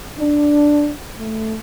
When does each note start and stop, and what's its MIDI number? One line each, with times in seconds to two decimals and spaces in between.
0.19 0.91 62
1.17 1.56 57